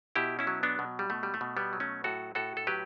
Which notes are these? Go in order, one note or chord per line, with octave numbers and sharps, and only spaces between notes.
B2 E4 G4
C#4 E4
F#3
B3 D4
B2
G3
B2 A3
G3
A3
B2
G3 B3
F#3
A3 C#4
A2 F#4 A4
A2 F#4 A4
A4
F#3 G4 B4